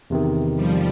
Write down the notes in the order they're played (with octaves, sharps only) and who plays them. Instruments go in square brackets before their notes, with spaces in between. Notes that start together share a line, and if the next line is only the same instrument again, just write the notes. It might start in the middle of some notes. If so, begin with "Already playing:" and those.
[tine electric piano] E2 C3 D#3
[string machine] F3 G3